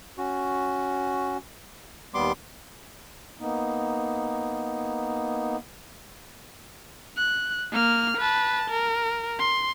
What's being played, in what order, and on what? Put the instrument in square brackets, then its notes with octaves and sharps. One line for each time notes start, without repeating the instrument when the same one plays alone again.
[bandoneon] C#4 F#4
D#2 G3 B3 C6 D6
[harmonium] A#3 B3 D#4
[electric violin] F#6
A#3 F6
B4 A5
A#4
C6